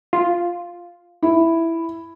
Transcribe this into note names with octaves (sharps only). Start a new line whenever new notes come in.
F4
E4